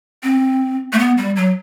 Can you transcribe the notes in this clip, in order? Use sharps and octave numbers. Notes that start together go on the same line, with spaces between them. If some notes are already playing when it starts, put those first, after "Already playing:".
C4
A3
B3
G3
F#3